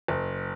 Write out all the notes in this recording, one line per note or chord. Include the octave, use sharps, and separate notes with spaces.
F#1